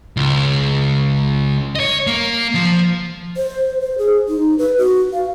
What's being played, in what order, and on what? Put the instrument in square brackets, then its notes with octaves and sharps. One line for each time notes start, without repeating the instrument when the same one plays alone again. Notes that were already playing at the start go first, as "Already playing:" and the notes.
[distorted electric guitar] C#2
C#5 D#5
A#3
F3
[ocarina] C5
C5
G#4
D#4
B4
F#4
F5